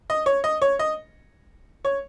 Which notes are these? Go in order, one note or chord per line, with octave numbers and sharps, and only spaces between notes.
D#5
C#5
D#5
C#5
D#5
C#5